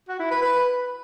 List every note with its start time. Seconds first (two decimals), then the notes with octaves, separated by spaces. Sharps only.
0.08 F#4
0.19 E4
0.31 B4
0.42 B4